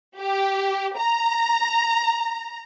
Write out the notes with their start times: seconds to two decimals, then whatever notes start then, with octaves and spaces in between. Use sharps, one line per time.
0.17 G4
0.97 A#5